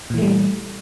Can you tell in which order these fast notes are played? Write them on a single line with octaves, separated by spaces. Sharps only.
A#2 E3 A3 G3